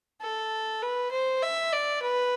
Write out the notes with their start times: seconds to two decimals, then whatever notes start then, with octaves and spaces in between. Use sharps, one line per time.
0.21 A4
0.82 B4
1.11 C5
1.42 E5
1.72 D5
2.02 B4